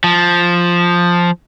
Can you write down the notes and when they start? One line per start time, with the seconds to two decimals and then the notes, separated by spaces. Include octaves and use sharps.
0.04 F3